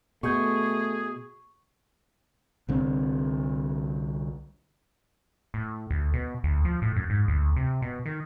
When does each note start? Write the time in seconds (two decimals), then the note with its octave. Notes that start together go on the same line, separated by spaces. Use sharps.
0.23 B2 A3 G#4 C#6 G6
2.69 C2 D3 C4
5.54 A2
5.91 D2
6.14 B2
6.44 D2
6.65 F3
6.82 A2
6.96 F#2
7.10 G#2
7.28 D2
7.56 C3
7.82 B2
8.06 D#3